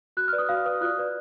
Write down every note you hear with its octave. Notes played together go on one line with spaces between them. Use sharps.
F#4 F#6
F6
B4 D5
D#6
F#4 F5
B4 D5 D#6
F4 F#6
B4 D5